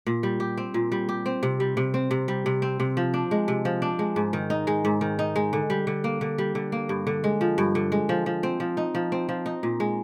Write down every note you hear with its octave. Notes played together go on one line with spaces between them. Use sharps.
A#2
G3
G4
C4
A#2
G3
G4
C4
C3
G3
C3
C4
C3
G3
C3
C4
C3
F3
D4
G#3
C3
F3
D4
G#3
G#2
D#3
D#4
G#3
G#2
D#3
D#4
G#3
D3
G3
D3
A#3
D3
G3
D3
A#3
G2
D3
G#3
F3
G2
D3
G#3
F3
F3
C4
F3
D#4
F3
C4
F3
D#4
A#2
G#3